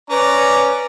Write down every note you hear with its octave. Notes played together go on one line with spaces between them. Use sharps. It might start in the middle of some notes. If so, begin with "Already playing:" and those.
C#4 B4 D5 A#5